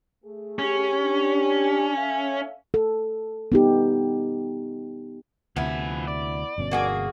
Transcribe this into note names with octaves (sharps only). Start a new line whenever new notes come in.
A3 G#4
C#4 G4
D4
A4 E5 F5
A4
B3 D#4 G4
D2 C3 F3 B3 E4 G#5
D5
G1 B2 C#4
A#3 F#4 G#4